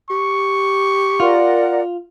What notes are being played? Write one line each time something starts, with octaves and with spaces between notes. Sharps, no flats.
G4 C#6
F4 A#4 D5 F#5